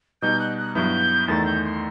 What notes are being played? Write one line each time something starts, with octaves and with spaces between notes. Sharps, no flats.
B2 G3 B3 D#4 G6
F#6
F#6
G2 F#3 B3 E4 G6
E2 D#3 A3 D#4 A6
G6
C6